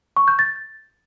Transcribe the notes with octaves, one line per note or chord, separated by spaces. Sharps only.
C#6
G6
A6